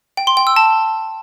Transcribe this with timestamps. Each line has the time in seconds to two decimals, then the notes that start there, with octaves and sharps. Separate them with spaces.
0.17 G5
0.27 C6
0.37 G5
0.47 E6
0.56 A5